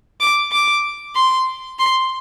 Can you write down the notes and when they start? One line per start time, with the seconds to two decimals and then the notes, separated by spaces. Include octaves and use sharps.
0.20 D6
0.52 D6
1.15 C6
1.79 C6